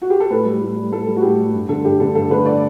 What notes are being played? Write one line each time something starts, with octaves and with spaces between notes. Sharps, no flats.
F#4
G4
A4
A2 B4
G3
A2
G3
A2 A4
G3
F#4
A2 G4
G3
G2
D3 A3 A4
G2 G4
D3 A3 A4
G2 A4
D3 A3 B4
D5